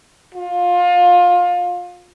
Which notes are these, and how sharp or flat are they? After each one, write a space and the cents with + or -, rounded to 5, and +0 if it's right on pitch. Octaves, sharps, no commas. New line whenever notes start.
F4 +25